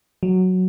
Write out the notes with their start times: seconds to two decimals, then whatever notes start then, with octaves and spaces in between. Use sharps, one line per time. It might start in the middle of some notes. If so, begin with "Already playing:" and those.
0.23 F#3